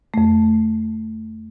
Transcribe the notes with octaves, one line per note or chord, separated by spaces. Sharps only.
F2 A3